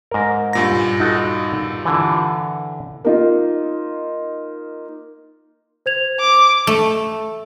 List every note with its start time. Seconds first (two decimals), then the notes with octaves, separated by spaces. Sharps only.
0.11 G#2 A#4
0.53 G2 A#2 A#6
1.00 D#4 F#4 A4
1.85 D3 E3
3.04 A#3 D#4 F4
5.86 C5 G#6 F7
6.20 D6
6.67 A3